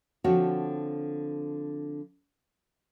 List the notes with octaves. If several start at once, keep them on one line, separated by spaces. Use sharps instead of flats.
D3 F3 C4 F#4 C#5